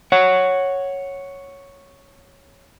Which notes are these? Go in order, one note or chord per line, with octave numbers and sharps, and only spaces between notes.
C#5 F#5